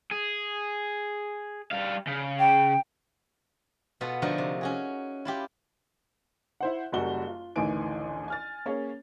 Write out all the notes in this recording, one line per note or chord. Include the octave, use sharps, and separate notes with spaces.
G#4
G3 F5
C#3
G5
B2 B3 F4 A4 B4
D3 F3 A3 D#4 F#4 A#4
C3
C#4 F#4 G#4
E4 F4 G4
E4 C5 F#5
F#1 F#2 G3 F#4 G7
F4
A1 D2 D#3 E3 G#5 D7
G#5 F6 A6
A#3 C#4 G#4 C#5